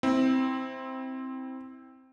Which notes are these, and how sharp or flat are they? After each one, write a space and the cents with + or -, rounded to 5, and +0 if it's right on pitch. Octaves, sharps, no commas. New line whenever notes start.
C4 +0 E4 -25